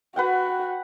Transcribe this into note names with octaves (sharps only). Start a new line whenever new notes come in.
F#4 B4 F#5 G5